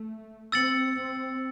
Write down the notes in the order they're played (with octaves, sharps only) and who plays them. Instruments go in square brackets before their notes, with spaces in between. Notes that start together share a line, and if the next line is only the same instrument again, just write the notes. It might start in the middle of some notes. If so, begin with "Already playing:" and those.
Already playing: [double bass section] A3
[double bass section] C4 [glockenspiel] E6 A6 C#7 F#7
[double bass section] C4